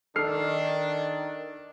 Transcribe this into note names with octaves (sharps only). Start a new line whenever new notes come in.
D#3 D4 A4 F6 C7